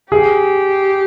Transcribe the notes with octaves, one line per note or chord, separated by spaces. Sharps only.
G4 G#4